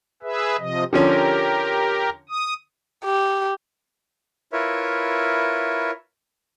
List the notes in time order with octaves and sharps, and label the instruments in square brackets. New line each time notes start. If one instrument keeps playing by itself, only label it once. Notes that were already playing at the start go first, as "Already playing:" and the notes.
[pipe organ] G#4 B4 E5
C3 F3 D#5
[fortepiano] D3 F3 C#4 [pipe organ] G4 A#4
[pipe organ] D#6
[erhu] G4
[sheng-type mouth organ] E4 F4 A#4 B4 C#5 E5